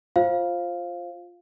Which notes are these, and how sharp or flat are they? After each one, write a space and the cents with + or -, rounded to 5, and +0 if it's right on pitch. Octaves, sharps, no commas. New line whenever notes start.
F4 +0 C5 +20 F5 +0